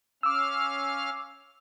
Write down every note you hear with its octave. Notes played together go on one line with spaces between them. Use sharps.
C#4 F5 D6 E6 F6